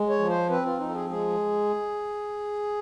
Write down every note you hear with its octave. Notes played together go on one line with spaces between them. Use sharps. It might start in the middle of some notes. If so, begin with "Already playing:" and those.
Already playing: G#3
C#5
F3
C5
C4 B4
F4
F3 D#4
A4
G#4
G#3 G#4